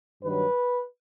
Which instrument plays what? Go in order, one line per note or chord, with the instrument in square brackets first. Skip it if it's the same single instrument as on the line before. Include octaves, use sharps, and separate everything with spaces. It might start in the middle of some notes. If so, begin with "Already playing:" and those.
[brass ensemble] G2 D#3 F#3 B4